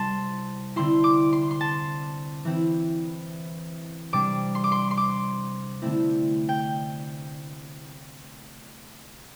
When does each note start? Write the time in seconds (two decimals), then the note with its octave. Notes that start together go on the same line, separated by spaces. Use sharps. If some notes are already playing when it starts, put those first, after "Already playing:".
Already playing: C3 G3 E4 A5 C6
0.76 D3 C4 E4 C6
1.04 D6
1.33 C6
1.51 C6
1.61 A5
2.45 E3 C4 E4
4.13 C3 G3 D4 D6
4.55 C6
4.64 D6
4.72 C6
4.91 C6
4.97 D6
5.82 D3 A3 C4 E4
6.49 G5